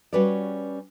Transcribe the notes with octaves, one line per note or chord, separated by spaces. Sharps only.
G3 C#4 F#4 B4 C#5 D5